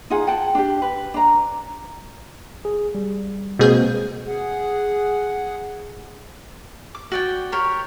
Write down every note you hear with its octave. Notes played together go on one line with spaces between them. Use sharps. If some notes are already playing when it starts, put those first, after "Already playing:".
D#4 F4 G#4 F#5
F#5 G5 A5
D4 G4
B4
D4 A#5
G#4
G3
B2 G#3 A#3 C4 G#4 G6
G#4 F#5
D6
F#4 D5 G5
G4 A#4 C#5